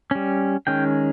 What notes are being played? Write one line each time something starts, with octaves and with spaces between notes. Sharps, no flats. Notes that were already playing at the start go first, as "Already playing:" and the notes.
G3 C#4
D#3 G#3 C#4 G5